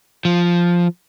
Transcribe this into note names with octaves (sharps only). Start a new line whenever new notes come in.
F3